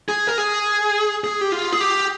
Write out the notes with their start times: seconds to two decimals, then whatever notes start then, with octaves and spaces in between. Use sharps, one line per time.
0.09 G#4
0.27 A#4
0.38 G#4
1.24 G#4
1.41 G4
1.52 F4
1.73 G#4
1.80 G4